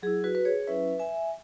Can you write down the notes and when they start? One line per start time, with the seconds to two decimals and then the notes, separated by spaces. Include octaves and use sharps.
0.02 F#3 E4 G#4
0.24 F#4 B4
0.35 B4
0.45 G#4 C#5
0.67 F#3 C#4 E4 B4 E5
0.99 E5 G#5